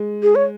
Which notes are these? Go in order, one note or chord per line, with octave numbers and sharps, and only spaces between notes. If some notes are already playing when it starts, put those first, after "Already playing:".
Already playing: G#3
G#4
C#5